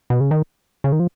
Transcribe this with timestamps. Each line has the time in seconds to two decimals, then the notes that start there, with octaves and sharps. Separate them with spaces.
0.10 B2
0.20 C#3
0.31 D#3
0.84 C#3
0.92 D#3
1.00 F3